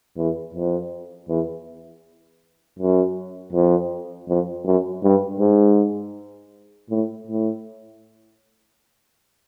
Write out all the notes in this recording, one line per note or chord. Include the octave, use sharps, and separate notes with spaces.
E2
F2
E2
F#2
F2
F2
F#2
G2
G#2
A2
A2